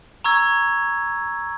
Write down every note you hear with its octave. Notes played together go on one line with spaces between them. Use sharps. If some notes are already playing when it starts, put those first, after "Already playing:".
A#5 C#6 E6 G#6